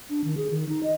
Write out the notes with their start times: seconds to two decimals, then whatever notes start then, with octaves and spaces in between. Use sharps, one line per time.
0.10 D4
0.24 D#3
0.37 G#4
0.51 D#3
0.69 D#4
0.83 D#5